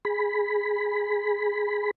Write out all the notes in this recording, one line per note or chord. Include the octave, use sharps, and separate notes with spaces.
G#4 B5